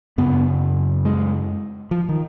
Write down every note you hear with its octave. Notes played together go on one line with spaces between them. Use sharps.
F#2 C#3 B3
G#3
F3
D#3